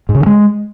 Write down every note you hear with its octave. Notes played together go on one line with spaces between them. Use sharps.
G#2
C#3
D#3
G#3